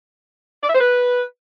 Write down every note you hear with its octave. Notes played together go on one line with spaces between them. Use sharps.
D5
E5
C5
B4